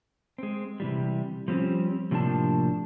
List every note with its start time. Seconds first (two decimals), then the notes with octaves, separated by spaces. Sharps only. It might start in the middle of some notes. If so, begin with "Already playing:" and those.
0.38 G#3 C4
0.80 C3 E3 G3
1.48 F3 G3 C4 C#4
2.11 A2 C3 F3 A#3 D4 A5